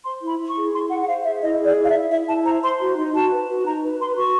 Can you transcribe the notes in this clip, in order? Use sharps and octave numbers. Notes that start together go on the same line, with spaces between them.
C5 C6
E4
B5
E4
C#6
G#4
E4 C6
G#4 F#5
F#5
C5 F5
G#4 E5
E4 D#5
G#4
D5
E4
F5
E5
E4
E4 E5
E4 A5
C5 A#5
C5 C6
F#4
D#4
F#4 A5
B4
F#4
D#4 A#5
B4
B4 C6
F#4 C#6